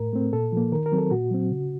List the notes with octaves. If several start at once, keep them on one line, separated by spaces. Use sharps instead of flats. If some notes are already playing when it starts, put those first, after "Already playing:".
Already playing: A2 A#4
A3 C4
A#2 A4
F3 A#3
D#3 A#4
A#4
F#3 C4
A4
A#2 F#4
F#3 C4
C#3